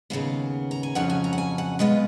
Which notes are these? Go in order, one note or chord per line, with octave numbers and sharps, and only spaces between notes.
D#2 C#3 F#3 B3 F5
A#5
G#5
F2 C#3 F#3 C#4 F4 F#5
G#5
A#5
F#5
G#5
F#5
B2 G#3 B3 F4 D#5